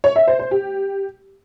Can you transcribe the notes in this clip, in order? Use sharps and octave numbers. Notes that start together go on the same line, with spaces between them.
C#5
E5
C5
C5
G4